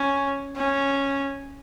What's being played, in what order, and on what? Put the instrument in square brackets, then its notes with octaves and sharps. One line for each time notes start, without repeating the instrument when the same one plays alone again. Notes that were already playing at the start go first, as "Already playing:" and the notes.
Already playing: [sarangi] C#4
C#4